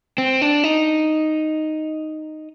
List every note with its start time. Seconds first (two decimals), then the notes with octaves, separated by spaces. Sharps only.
0.18 C4
0.42 D4
0.64 D#4